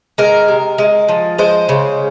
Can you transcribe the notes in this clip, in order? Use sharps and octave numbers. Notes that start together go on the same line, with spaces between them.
G#3 A#4
C3
G#3
F3
G#3 C5
C#3